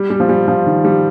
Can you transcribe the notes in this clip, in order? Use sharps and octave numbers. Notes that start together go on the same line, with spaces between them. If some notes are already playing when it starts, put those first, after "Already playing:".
Already playing: G3
G3
F3
G3
F3
D#3
G3